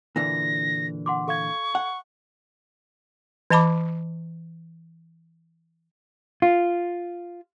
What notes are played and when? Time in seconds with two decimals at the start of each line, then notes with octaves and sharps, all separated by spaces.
0.16 A#2 D3 E3 A#6
1.06 F#5 C6 D6
1.28 A4 F5 C#6 G#6
1.75 F#5
3.51 E3 D#5 A5 B5 D6
6.42 F4